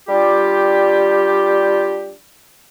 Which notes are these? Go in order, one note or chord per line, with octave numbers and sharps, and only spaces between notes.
G3 D4 F4 G4